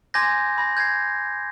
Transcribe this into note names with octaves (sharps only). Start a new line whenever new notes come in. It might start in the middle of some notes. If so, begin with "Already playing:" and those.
G#5 C6 D6 G6 G#6 A#6
B5 A#6
G6 G#6 A#6 C7